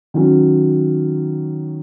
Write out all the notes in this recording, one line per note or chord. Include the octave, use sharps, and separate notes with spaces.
D#3 F#3 C#4